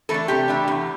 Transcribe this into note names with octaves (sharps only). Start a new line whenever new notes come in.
E3 A3 D4 A4
C3 G4
E3 A3 D4
E2